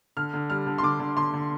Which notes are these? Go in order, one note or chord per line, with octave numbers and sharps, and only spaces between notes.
D3 F6
D3
G3 F6
D3
C6
D3 D6
D3
D3 C6
D3